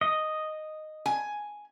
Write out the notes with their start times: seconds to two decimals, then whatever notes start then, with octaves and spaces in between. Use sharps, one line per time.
0.01 D#5
1.06 G#5